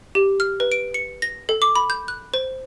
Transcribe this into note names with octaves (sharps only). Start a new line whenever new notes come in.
G4
F6
B4
D7
C#7
A#6
A4
D6
B5
G6
F#6
C5